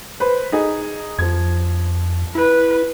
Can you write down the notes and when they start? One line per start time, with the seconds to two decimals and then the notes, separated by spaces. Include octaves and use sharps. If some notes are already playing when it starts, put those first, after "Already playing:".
0.20 B4 C5 B5
0.52 D#4 G#4 D#5
1.19 F2 F3 G#6
2.35 E4 B4